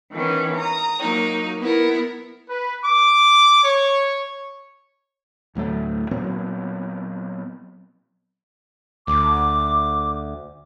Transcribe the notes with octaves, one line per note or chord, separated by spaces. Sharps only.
D#3 E3 B3 C#4
A#5 D#6
F#3 A#3 D#4
B3 E4 A#4
B4
D6
C#5
D1 D2 F#3 A3
A#2 F#3 B3 C4
D2 D6